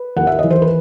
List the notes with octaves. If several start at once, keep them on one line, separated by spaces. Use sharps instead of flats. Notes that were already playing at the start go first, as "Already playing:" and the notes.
Already playing: B4
D#2 F#5
E5
D#5
E3
C5
B4